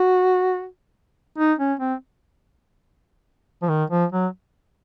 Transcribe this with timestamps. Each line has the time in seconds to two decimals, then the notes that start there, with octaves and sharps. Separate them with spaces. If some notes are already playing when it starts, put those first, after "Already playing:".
Already playing: F#4
1.38 D#4
1.59 C#4
1.79 C4
3.62 F3
3.69 D#3
3.90 F3
4.12 F#3